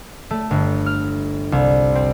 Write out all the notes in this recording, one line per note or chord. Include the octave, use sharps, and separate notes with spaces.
A3
G1
F6
C2
C4